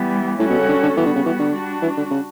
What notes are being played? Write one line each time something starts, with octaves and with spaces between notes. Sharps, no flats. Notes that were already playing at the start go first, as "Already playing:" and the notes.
Already playing: E3 G3 B3
A2 G3 C#4 F#4 A4
B2
C#3
D3
D3
E3 G3 B3 F#4
D3
C#3
E3
D3
G3 D4 F#4
E3
D3
C#3